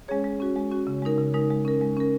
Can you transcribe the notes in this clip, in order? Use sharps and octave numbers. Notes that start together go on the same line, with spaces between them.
G#3 C#4 G#4 C#5
G#3
C#4 F#4
G#3
C#4 F#4
C#3
G#3 D#4 A#4
C#3
G#3 D#4 A#4
G#3
C#4 A#4
G#3
C#4 A#4